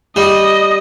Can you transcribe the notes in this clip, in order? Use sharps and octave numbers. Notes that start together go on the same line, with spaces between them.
G3 D#5